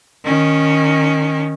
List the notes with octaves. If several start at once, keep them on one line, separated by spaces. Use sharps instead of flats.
D#3 C#4